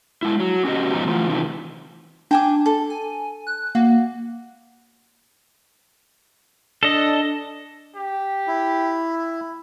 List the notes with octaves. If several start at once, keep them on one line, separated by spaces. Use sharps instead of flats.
G#3 E4
F#3
C#4 F#4 G4 D#5
G#2 B2 F3 A#5
E3 A3 F4
C3 D#3 E3
D4 G5 G#5 D6
A4
G#5
F#6
A#3 F#4
D4 A4 D#5
G4
E4